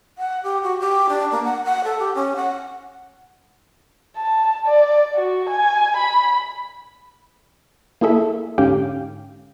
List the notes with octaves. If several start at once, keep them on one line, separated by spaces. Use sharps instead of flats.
F#5
G4
F#4
G4
D4
A#3
F#5
F#5
A4
G4
C#4
F#5
A5
D5
F#4
G#5
B5
A#3 E4 G#4 A4 E5
G#2 D3 C#4 G4 F5 G5